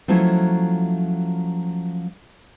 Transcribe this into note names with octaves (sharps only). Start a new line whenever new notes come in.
F3 F#3 A3 C#4 E4